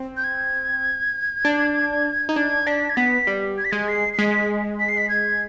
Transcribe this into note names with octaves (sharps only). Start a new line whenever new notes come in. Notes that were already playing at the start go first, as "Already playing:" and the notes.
Already playing: C4
G6
G#6
D4
D#4
D4 G#6
D4 B6
G#6
B3 B6
G3
G#6
B6
G#3 G#6
C7
C7
G#3 B6
B6
C7
B6
G#6